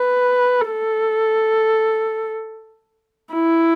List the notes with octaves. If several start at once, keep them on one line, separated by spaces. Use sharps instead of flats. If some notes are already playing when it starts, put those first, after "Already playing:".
Already playing: B4
A4
E4